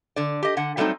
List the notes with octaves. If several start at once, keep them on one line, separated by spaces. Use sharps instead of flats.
D3 D5
G4 D#5
D3 F#5
F#3 G3 A3 B3 C4 D#4